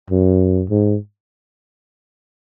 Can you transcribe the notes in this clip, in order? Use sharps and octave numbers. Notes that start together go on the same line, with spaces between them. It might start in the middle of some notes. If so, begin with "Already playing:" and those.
F#2
G#2